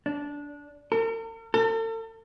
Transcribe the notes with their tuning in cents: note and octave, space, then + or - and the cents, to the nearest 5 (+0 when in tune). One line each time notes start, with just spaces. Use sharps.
D4 -15
A#4 -45
A4 +40